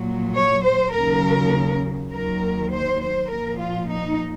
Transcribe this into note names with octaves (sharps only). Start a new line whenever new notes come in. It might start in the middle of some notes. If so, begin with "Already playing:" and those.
Already playing: A#2 F#3
C#5
C5
D#2 C#3 F#3 A#4
D#2 D#3 F#3 A#4
C5
C5
A#2 F3 A#4
F4
D#4